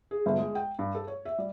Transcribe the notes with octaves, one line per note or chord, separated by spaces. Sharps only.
G#4
G1
G#3
G5
G2
A4
C#5
E5
G3